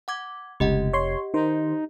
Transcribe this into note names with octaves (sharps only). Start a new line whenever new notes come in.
F#5 D6 G#6
F1 C#2 G4 D#5 F#5
C#5 C6
D#3 D#4 C5